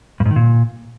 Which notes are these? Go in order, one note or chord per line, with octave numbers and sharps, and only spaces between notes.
G2
G#2
D#3
A#2